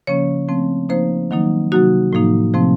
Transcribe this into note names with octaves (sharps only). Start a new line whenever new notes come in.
C#3 F3 A#3 C#4 C#5
F3 A3 C4
F3 A#3 D#4 C5
D#3 F#3 A#3 D#4
C3 F#3 A#3 D#4 F#4
A2 F3 A#3 D#4
C3 F3 A3 C4